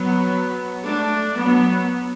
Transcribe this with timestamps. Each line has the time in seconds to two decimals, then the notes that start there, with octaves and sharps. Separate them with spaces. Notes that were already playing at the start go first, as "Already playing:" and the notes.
Already playing: F#3 B3
0.85 A3 D4
1.36 F#3 B3